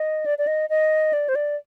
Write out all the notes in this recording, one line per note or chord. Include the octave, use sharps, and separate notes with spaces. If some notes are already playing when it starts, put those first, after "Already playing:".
Already playing: D#5
D5
D5
D#5
D#5
D5
C5
D5